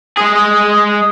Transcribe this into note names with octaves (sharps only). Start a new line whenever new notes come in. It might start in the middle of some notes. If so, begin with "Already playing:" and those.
G#3 G#4